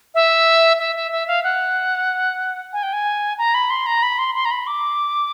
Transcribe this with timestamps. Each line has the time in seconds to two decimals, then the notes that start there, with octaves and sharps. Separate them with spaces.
0.15 E5
0.79 E5
0.96 E5
1.11 E5
1.28 F5
1.44 F#5
2.73 G#5
2.83 G5
2.93 G#5
3.38 A#5
3.54 B5
3.70 C6
3.86 A#5
4.03 B5
4.19 C6
4.35 C6
4.45 A#5
4.51 B5
4.67 D6